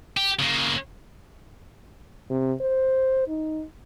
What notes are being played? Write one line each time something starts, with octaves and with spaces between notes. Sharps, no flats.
G4
C#3 A#3
C3
C5
D#4